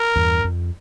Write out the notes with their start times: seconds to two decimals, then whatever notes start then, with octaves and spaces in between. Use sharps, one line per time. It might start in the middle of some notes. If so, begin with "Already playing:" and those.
Already playing: A#4
0.16 E2 G2
0.44 F2